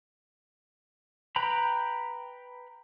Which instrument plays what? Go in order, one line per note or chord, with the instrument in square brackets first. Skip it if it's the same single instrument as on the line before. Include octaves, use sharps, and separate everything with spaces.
[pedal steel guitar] B4 G5 A#5 B5